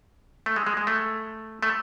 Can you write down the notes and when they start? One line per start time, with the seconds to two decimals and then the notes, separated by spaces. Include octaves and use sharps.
0.46 A3
0.56 G#3
0.67 G#3
0.77 G#3
0.87 A3
1.63 A3